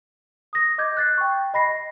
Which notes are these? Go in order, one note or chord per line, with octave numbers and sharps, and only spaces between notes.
D#6 A#6
D#5 D6 G6 G#6
F#6 A6 C7
G5 C#6
D#5 B5 A#6 C7